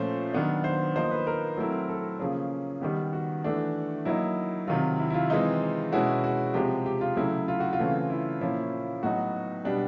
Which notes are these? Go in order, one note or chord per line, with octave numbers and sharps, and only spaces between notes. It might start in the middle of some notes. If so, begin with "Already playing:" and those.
Already playing: A#2 F3 A3 C#4 C5
D#3 F#3 B3 D4
C5
F3 A#3 D#4 C5
B4
A#4
F#3 A3 C4 E4
A4
C#3 F3 A#3 C#4 G#4
D#3 G3 B3 G4
F#4
E3 A3 D4
F#3 A#3 D#4 E4
C3 D#3 F#3 F4
E4
E4
F4
E3 G#3 C4 D#4
B2 G#3 C#4 E4 F#4
F#4
C3 F3 G#3 G4
G4
F4
C#3 F#3 A3 E4
F4
F#4
F4
C#3 E3 A3 C4
E4
A#2 F3 A#3 C#4 E4
A2 F#3 B3 D#4 F#4
B2 G3 B3 D4 G4